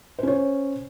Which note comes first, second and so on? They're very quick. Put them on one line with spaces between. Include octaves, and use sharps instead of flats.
C5 C#4 C#5